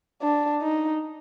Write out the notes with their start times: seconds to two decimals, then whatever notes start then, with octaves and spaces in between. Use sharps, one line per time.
0.22 D4
0.62 D#4